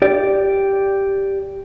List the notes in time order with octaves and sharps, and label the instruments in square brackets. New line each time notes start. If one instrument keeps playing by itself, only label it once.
[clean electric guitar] G4 D5